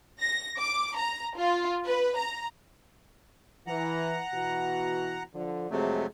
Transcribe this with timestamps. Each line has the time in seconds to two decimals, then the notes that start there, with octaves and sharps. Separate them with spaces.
0.20 A#6
0.58 D6
0.97 A#5
1.38 F4
1.86 B4
2.18 A#5
3.67 E3 F#5 A#5
4.34 B2 E3 F#4
5.34 D3 F3
5.71 F2 C3 F#3 G#3 A3 G#4